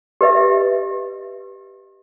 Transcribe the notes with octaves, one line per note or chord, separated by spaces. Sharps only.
G4 B4 D#5 E5